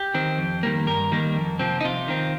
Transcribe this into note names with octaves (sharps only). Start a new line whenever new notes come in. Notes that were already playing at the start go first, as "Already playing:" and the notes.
Already playing: G4
D#3 C4
F2
D#3 G3 A#3
G2 A#4
D#3 G3 A#3
F2
C3 F3 C4
D#4
C3 F4
D#3 C4